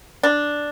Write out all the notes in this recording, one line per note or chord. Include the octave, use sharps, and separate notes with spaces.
D4